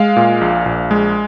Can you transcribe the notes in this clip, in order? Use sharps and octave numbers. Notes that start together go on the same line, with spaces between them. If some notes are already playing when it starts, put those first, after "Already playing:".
Already playing: G#3 F5
A#2
A#1
A#1
G#3